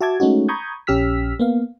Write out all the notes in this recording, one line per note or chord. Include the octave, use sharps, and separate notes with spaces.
F#4 E5 A5 D6 G#6
G#3 A3 C#4 D#4 F#4
A#5 B5 C#6 D#6 G6 G#6
A#1 C#4 G4 E6 F6 B6
A#3 B3 F5